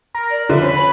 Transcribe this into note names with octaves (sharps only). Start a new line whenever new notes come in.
A#4
D5
D3 F3 B4 E5
C#4 C5
B5